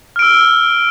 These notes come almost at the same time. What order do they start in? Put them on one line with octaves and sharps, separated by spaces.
F6 D7 E6